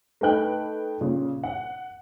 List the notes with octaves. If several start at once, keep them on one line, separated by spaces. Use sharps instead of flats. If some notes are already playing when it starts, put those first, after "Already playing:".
A3 D#4 B4 G5 F#6
A#2 C#3
F#5